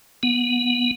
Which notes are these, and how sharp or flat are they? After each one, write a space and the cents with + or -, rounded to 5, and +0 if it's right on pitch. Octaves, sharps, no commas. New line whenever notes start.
B3 -20